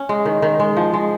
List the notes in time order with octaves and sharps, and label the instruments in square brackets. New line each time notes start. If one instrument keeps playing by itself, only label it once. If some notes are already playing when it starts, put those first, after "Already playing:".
Already playing: [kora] C#4
G#3
D#3
D#3
G#3
F3
G#3